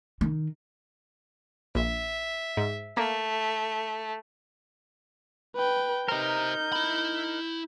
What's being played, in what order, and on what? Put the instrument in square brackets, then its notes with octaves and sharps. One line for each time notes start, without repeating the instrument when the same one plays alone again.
[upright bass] D#3
[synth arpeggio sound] A#1 [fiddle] E5
[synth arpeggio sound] G#2
[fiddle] A3 [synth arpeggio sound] A#3
[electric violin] B4 G5
[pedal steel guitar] D#4 A#4 [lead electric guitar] G4 C5 [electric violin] G6
[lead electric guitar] E4 B5